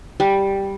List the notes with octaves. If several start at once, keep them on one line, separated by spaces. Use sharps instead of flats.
G3